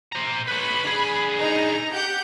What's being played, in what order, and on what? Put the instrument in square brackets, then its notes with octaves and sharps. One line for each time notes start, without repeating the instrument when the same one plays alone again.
[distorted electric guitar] C5 A#5
[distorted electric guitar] B4 C#5 [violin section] B5
[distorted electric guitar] D3 G#4
[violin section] D#4 A#5
G4 F#5 G6